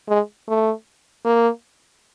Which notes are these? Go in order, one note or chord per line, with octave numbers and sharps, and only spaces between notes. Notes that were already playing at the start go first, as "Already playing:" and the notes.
G#3
A3
A#3